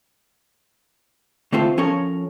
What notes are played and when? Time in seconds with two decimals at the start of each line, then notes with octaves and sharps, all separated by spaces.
1.52 D3 A3 C4 F4 A4 C5
1.77 F3 C#4 A4 A#4 C#5